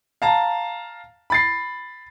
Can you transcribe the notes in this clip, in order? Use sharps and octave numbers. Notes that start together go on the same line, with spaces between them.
F5 A5 A#5
B5 A6 C7